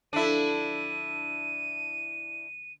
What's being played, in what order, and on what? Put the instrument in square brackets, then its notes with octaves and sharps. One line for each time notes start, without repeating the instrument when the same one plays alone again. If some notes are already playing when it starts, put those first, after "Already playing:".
[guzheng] D3 F3 [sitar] D4 E4 [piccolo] D#7